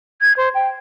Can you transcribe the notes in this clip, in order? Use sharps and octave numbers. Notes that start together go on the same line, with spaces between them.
G#6
C5
G5